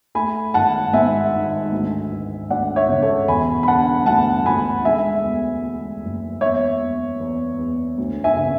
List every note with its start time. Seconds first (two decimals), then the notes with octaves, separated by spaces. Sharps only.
0.15 A3 G#5 B5
0.54 G#1 F#5 A5
0.93 G#2 E5 G#5
1.33 G#1
1.72 D2
2.11 E3
2.50 D2 D5 F#5
2.76 C#5 E5
2.89 C#3
3.02 A4 C#5
3.28 E1 G#5 B5
3.63 B5
3.68 D3 F#5 A5
4.06 D2 F#5 A5
4.45 D2 G#5 B5
4.85 G#3 E5 G#5
5.24 E2
5.63 G#3
6.03 F#1
6.41 E2 C#5 E5
6.80 E2
7.20 E2
7.59 E2
7.98 D2
8.24 E5 G#5
8.37 C#3